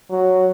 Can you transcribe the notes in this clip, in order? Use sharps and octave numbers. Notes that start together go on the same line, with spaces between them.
F#3